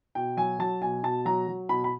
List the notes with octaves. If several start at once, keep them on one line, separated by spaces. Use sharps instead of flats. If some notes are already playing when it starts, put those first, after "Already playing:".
B2 G5
F#3 G#5
F#3 A5
B2 G#5
B2 A5
F#3 A#5
F#3
B2 B5
B5